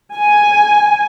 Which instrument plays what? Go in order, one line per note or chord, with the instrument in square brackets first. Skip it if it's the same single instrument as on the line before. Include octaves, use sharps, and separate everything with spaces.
[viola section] G#5